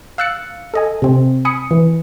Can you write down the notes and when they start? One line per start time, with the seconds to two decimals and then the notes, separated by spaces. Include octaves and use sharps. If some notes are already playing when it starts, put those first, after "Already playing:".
0.18 F5 E6 F#6 A6 C#7
0.74 A4 D#5 G#5
1.02 C3 C4
1.45 G#5 B5 D#6 C#7
1.71 E3